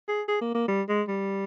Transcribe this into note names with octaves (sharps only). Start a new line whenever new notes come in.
G#4
G#4
A#3
A#3
G3
G#3
G3